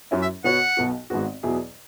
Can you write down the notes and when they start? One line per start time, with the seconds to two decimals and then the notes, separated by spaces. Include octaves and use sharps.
0.11 F#2 F#3 C#4 E4
0.22 E5
0.44 B2 B3 F#4 C#5 F#5
0.77 B1 B2 B3 F#4
1.10 G#1 G#2 G#3 B3 F#4
1.43 E2 B2 F#3 E4 G#4